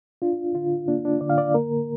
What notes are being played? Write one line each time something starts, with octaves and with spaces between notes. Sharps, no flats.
D4 F4
D3 F4
A#3 D4
D4
D3 D5
F5
D5
A#3 A#4